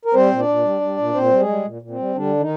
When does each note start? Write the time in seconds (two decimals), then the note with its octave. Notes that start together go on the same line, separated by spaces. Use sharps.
0.05 A#4
0.14 G3 C4 C5
0.31 A#2
0.39 D4 D5
0.48 A#2
0.64 G3
0.81 G3
0.98 A#2
1.15 A#2 C4 C5
1.31 G3
1.40 G#3 G#4
1.48 G3
1.65 A#2
1.82 A#2
1.90 C4
1.99 G3
2.15 D3 G3 D4
2.40 D#3 D#4